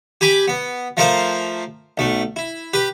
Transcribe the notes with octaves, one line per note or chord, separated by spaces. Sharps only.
G4 G#5 B5 D6
B3
F3 A3 A#4 C5 F5
B1 A3
E4
G4 B4